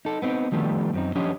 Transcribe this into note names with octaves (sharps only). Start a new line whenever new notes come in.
D#4 A4
B3 C4 D#4
D#3 F3 G3 A3 B3
F#2 C4 D#4
F3 C#4 D4 G4 C#5 D#5